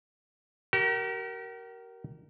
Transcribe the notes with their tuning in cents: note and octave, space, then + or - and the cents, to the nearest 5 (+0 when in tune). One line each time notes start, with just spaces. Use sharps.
G4 -45 A#4 +0